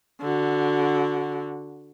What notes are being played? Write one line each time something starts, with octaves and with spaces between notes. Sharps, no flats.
D3 F#4